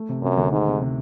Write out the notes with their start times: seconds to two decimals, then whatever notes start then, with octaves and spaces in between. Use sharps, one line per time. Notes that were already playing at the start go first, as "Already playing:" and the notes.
Already playing: A3
0.09 C3
0.23 F#2 C3
0.37 D2
0.52 G#2 D#3
0.67 C3
0.81 C3